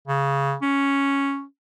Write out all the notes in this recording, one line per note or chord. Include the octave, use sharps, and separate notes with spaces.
C#3
C#4